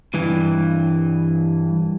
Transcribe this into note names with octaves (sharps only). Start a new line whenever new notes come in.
G2 E3